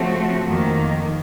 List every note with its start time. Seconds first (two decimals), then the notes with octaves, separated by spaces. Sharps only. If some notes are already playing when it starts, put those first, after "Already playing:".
Already playing: C#3 F3 A3 C4 F#4
0.47 F2 D#3 A#3